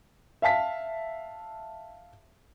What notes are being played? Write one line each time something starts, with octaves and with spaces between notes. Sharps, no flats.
E5 F5 A5 B6